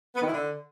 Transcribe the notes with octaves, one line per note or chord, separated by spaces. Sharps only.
B3
D#3
E4
D3